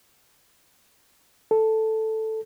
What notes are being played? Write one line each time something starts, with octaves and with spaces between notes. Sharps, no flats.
A4